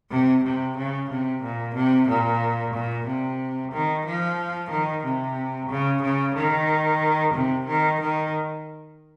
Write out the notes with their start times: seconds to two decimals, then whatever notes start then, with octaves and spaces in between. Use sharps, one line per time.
0.11 C3
0.44 C3
0.77 C#3
1.10 C3
1.43 A#2
1.75 C3
2.08 A#2
2.74 A#2
3.06 C3
3.72 D#3
4.06 F3
4.71 D#3
5.04 C3
5.69 C#3
6.02 C#3
6.35 D#3
7.34 C3
7.67 D#3
8.01 D#3